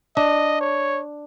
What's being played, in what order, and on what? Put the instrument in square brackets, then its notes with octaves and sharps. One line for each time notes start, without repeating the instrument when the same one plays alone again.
[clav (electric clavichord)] D4 [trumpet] D#5
[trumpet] C#5